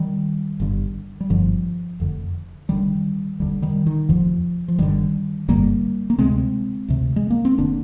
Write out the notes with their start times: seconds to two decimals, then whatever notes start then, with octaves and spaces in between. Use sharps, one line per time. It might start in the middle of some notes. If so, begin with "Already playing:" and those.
Already playing: D#3 G3
0.60 G1 G2 D3
1.20 G3
1.30 G1 G2 D3 F3
2.00 F1 F2 D3
2.69 F1 F2 D3 D#3 G3
3.40 F1 D#2 D3 G3
3.62 D#3 G3
3.86 D#3
4.09 F1 D#2 D3 F3
4.68 F3
4.78 G1 G2 D3 D#3 G3
5.48 G1 G2 D3 G3 A#3
6.10 A#3
6.18 D2 C3 G#3 C4
6.88 D2 C3
7.16 G#3
7.30 A#3
7.45 C4
7.58 F1 D3 A#3 D4